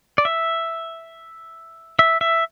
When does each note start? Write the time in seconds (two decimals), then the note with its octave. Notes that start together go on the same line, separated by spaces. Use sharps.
0.18 D5
0.25 E5
1.99 E5
2.21 E5